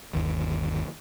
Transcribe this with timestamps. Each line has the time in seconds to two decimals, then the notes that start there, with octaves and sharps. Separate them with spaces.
0.13 G1 D#2